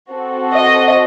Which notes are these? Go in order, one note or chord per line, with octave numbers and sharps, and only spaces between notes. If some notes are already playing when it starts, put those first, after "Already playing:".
C4 F#4 A4
D#5